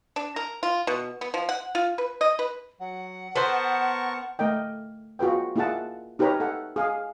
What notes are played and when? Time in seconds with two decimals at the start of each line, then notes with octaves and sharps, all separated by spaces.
0.16 D4
0.36 A#4
0.63 F4
0.87 B2
1.21 B3
1.34 F3
1.49 F#5
1.75 F4
1.98 B4
2.21 D#5
2.39 B4
2.80 F#3 F#5
3.36 B3 A#4 C5 A5 C#6
4.39 A3 A#4 D#5 G5
5.19 F4 F#4 G#4 B4 G5
5.56 A#3 E4 F4 G#4 F#5 A5
6.19 D#4 G4 A#4 B4 C#5 A#5
6.40 A4 F#5
6.76 G#4 F5 G#5